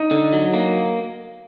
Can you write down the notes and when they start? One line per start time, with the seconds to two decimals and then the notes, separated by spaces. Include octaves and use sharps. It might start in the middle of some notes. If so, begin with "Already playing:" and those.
Already playing: D#4
0.11 D3
0.33 F#3
0.54 A#3